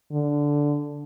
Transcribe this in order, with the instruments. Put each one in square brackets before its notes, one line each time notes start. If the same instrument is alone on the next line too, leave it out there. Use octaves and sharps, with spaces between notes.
[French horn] D3